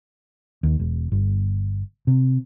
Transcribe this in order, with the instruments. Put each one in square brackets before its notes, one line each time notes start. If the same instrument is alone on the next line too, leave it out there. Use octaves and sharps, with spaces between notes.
[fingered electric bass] D#2
E1
G1
C3